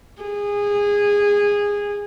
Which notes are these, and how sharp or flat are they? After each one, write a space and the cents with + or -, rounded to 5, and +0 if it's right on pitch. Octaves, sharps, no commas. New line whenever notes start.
G#4 -20